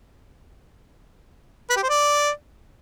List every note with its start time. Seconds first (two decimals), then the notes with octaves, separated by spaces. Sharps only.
1.70 B4
1.76 G4
1.83 C5
1.89 D5